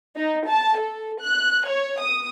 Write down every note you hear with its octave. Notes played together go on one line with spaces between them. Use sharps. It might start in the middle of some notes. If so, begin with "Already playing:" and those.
D#4
A5
A4
F#6
C#5
D#6